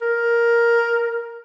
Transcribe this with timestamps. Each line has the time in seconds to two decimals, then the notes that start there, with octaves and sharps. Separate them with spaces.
0.02 A#4